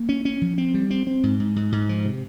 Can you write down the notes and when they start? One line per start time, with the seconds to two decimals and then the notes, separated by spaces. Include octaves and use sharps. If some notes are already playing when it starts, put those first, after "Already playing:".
Already playing: A#3
0.09 C#4
0.25 C#4
0.41 F3
0.58 C4
0.74 G3
0.90 C4
1.07 C4
1.23 G#2
1.40 G#2
1.56 G#2
1.72 G#2
1.89 F3
2.05 C3